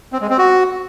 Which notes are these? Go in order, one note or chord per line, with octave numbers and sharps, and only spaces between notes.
C4
G#3
C4
F#4